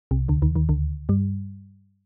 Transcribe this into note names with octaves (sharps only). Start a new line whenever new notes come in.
C2 C3
D2 D3
D#2 D#3
D#2 D#3
D2 D3
G2 G3